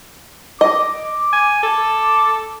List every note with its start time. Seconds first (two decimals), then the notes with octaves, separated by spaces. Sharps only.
0.61 D#5 D6
1.33 G#5
1.63 A4 D6